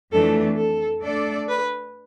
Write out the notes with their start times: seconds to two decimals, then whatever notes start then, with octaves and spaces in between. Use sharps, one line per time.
0.12 F2 E3 A3 D4 A4
0.57 A4
1.02 A3 D4 A4 D5
1.48 B4